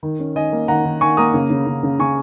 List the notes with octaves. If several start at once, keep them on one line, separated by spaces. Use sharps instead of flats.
D#3
C#4
D#3 D#5 G#5
A#3
D#3 F#5 A#5
D#3
D#3 G#5 C#6
A#3 A#5 D#6
C#3
C#3
C#3
C#3
C#3 G#5 C#6